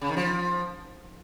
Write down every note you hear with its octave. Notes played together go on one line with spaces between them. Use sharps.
C#3
D#3
F3